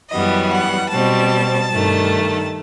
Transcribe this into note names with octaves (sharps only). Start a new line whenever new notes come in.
F#2 E3 G3 B3 D#5
F#5
B2 G3 C4 A5
G2 D#3 A3